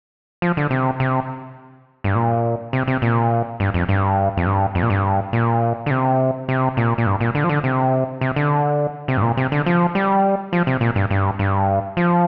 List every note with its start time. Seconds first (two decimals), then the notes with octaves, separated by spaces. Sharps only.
0.42 F3
0.57 D3
0.71 C3
1.00 C3
2.04 G2
2.15 A#2
2.73 C3
2.88 C3
3.02 A#2
3.60 G2
3.74 F2
3.89 G2
4.37 F2
4.46 G2
4.75 F2
4.83 A#2
4.90 G2
5.33 A#2
5.86 D3
5.91 C3
6.49 C3
6.77 A#2
6.98 A#2
7.06 G2
7.21 A#2
7.35 D3
7.44 F3
7.49 D3
7.64 C3
8.21 C3
8.36 D3
9.08 C3
9.17 G2
9.22 A#2
9.37 C3
9.52 D3
9.66 F3
9.95 G3
10.53 F3
10.67 C3
10.81 A#2
10.96 G2
11.11 G2
11.39 G2
11.97 F3